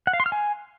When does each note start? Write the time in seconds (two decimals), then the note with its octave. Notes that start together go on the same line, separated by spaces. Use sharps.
0.07 F#5
0.13 F5
0.20 C6
0.26 F6
0.32 G#5